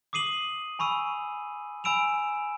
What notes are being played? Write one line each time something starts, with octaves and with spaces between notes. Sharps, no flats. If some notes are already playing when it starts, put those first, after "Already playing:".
D6 D#6 C7 D#7 F#7
G#5 B5 C#6 E6 D#7
G#5 B5 E6 D7 E7 F7